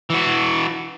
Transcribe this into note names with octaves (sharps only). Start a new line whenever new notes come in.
E3 F#4